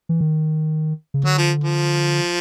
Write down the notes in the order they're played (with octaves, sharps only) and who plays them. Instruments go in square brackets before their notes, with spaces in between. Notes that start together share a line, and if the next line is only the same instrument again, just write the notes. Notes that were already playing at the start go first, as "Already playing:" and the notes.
[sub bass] E3
D#3
C#3
[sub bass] D3 [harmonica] F#3
[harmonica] F3
F3